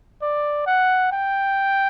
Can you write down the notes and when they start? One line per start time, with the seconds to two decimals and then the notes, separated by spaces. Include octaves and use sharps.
0.22 D5
0.67 F#5
1.12 G5